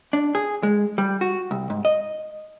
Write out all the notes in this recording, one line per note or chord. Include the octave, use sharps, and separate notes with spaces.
D4
G#4
G#3
G3
F#4
C2
G#2
D#5